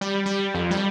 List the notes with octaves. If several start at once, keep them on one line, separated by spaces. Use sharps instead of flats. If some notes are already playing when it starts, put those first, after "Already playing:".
G3
G3
F2
G3